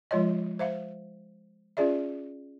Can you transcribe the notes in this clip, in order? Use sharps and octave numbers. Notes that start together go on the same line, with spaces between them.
F3 G#3 F4 C#5 D#5
C5 E5 F5
C#4 F4 G#4 D5 E5